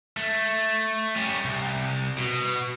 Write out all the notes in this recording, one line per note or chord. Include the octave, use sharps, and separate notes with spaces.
A3
G3 C#4
C2
B2